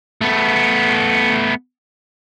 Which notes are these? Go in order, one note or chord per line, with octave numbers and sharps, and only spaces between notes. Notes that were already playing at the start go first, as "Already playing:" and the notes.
A3 B3